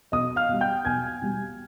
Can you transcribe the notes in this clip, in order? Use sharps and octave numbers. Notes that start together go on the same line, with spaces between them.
B1 D#5 D#6
F5 F6
B2 G3
G5 G6
B1 G#5 G#6
B2 G3